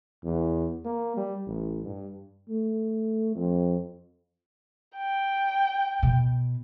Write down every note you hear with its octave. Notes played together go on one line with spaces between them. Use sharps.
E2
A#3
G3
A1
G2
A3
F2
G5
B2